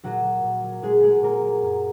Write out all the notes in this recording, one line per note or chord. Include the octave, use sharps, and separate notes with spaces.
A#2 F#3 F#4
F#3
A#2
F#3
A#2 G#3 G#4
F#3 G#3 G#4
A#2 A#3 A#4
F#3
F#2